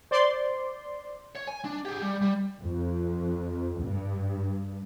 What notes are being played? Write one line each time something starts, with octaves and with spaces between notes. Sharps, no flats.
C5 D5 C6
C#5
G#5
D4
G4 G#4
G3
G3
F2
G2